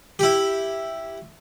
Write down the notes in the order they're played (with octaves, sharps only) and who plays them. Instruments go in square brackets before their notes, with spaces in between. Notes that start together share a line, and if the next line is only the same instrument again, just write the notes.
[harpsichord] E4 G4